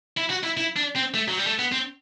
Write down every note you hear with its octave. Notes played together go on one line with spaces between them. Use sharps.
E4
F#4
E4
E4
D4
C4
A3
F#3
G3
A3
B3
C4